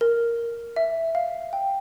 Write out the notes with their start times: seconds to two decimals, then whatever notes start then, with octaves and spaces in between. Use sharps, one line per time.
0.01 A#4
0.76 E5
1.15 F5
1.53 G5